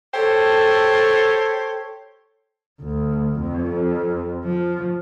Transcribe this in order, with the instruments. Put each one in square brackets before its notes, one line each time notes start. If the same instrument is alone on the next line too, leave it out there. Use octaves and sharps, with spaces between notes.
[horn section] G4 A4 C5 C#5
[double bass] D2
F2
F3